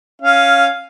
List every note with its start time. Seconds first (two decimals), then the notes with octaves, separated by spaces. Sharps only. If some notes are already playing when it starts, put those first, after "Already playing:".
0.22 C#4 F5